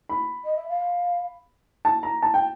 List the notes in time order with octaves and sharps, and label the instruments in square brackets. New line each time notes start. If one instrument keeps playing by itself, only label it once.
[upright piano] B5
[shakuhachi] D#5
E5
F5
[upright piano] A5
A#5
A5
G5